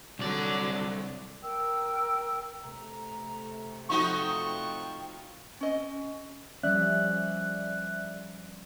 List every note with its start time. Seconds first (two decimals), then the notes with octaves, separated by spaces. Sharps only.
0.19 C2 D3 F#3 D5
1.43 A#4 G5 E6
2.63 C3 A3 A#5
3.90 F3 D#4 F#4 G5 C#6
5.61 C#4 D#5
6.63 F3 G3 C#4 D5 E5 F#6